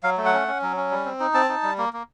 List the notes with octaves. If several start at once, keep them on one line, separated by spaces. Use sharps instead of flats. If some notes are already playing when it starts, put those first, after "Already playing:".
F#3 F5
A3
F#5
C#4
C#4
F#3
C#4
G3
C4
D#4
C4 A5
D#4
G3
A#3
A#3